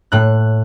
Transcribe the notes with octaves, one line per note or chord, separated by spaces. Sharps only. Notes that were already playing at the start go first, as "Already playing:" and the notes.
A2 F#6